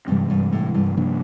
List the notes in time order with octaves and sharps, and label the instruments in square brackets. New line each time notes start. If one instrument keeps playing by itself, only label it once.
[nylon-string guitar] G2 [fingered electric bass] C3 E3 G#3 C4
[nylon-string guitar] G2
A2
G2
[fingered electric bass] C3 F3 A#3 D4